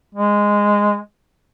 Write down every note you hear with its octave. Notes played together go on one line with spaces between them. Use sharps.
G#3